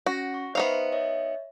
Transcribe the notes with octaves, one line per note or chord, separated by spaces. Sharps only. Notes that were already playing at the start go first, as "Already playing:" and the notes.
C#4 F#4 F#5 A#6
C#6
B3 D#4 C5 E5 F5
C#5 D#5 E5